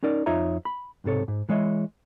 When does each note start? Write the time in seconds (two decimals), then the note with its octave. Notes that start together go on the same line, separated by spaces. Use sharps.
0.03 C#4 D#4 A#4 D5
0.26 F2 D#4 F4 C#5 E5 A#5
0.65 B5
1.04 B1 G#2 C3 A4 C#5
1.28 G#2
1.49 E3 G#3 C#5 D#5 E5